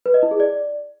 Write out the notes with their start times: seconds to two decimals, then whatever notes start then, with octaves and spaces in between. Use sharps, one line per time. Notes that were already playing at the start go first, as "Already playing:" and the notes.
0.06 B4
0.14 D#5
0.23 E4
0.31 G#4
0.40 D5